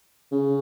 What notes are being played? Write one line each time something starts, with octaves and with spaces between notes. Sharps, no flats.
C#3